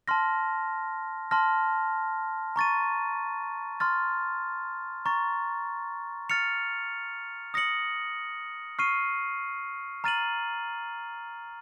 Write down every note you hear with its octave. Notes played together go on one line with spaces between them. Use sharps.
A5 C6 F6 A#6
A5 C6 F6 A#6
A#5 C#6 A6 D#7
C6 F6 A6
A#5 C#6 A6
F6 A6 C#7 F7
D#6 A#6 C#7 F#7
C#6 F6 C7 D#7
A#5 F6 A6 D#7 F#7